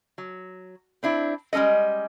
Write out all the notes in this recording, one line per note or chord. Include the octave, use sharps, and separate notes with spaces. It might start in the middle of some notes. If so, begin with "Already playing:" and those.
F#3
C4 D4 E4
G3 G#3 C#4 A4 D#5